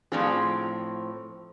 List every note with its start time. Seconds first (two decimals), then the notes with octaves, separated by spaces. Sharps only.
0.12 A2 F3 C4 D4 F4 G#4